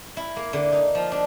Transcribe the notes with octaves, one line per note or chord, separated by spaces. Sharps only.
E4
A#3
D3
D#4
F3
D4